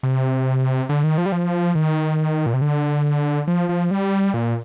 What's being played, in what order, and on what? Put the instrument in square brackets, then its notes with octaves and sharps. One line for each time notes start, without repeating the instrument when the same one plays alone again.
[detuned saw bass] C3
D3
D#3
F3
G3
F3
D#3
A#2
C3
D3
F3
F3
G3
A#2